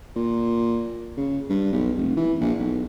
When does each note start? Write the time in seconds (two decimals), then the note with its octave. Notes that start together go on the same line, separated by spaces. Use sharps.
0.16 A#2
1.17 C#3
1.49 G2
1.73 B1
1.97 F1
2.17 E3
2.40 A#1
2.59 B1